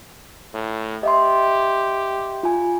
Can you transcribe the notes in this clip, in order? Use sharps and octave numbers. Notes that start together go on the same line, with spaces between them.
A2
G4 D#5 E5 C6
F4 G#5